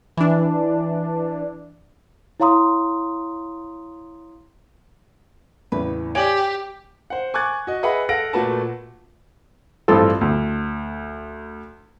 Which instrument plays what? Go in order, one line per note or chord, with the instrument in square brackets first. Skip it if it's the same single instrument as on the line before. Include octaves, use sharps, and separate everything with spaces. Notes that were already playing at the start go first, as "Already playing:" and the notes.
[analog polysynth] E3 D4
[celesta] E4 C#5 F5 A#5 C6 D#6
[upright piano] E2 A2 C#3 [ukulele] B4
[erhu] G4 [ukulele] C#5 D5 G#5 [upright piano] D7 F#7
[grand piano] C5 F#5
G#5 C#6 D6 F#6 G#6 A6
F#4 D#5
G#4 B4 D#5 E5 F#5 B5
A4 F5 F#5 A#6 D7
A#2 A3 F#4 B4 A5
[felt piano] A1 G2 C4 F4 A4
D2